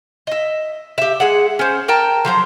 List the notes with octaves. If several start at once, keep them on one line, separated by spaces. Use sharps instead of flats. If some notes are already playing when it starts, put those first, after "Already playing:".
D#5 E5
G4 E5
G#3 G#4 F#5
C#4 C5
A#4 G5 A5 A#5
F3 F#3 C5 A#5